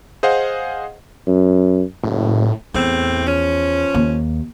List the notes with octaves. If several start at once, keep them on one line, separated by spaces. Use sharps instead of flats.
G#4 C5 D#5 F5 F#5
F#2
F#1 A2
E2 A2 E3 C4
F3 C#4
D#2